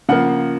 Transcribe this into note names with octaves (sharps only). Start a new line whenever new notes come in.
C#3 F3 A#3 F#5